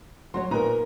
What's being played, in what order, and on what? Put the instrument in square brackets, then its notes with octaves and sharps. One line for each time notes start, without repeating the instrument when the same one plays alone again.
[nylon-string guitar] F#3 F#4 C#5 [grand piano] C6
[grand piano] A#2 B4 A#5 [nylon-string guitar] D#4 A#4